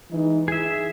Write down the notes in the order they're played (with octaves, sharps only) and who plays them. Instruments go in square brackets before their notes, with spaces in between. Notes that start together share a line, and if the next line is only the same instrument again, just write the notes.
[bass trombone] E3 [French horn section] G#3 D#4
[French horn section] E4 [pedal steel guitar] G#4 E5